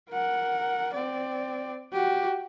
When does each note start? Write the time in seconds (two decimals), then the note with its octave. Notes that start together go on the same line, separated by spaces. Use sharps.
0.10 A#4 F#5
0.94 C4 D5
1.92 F#4 G4